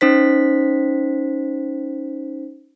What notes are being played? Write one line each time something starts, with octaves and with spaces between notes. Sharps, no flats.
C#4 D#4 C5 B6